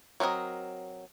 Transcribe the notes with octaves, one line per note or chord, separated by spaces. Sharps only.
F#3 C4 D4 A#4 D#5